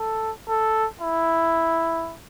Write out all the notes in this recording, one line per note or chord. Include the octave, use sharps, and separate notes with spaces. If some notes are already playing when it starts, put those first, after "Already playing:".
Already playing: A4
A4
E4